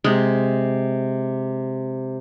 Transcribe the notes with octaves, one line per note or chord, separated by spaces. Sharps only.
C3 G#3